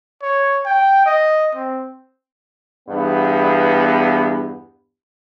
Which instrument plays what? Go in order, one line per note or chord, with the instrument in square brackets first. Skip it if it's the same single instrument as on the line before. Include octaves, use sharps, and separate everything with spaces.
[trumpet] C#5
G5
D#5
C4
[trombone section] E2 G2 B3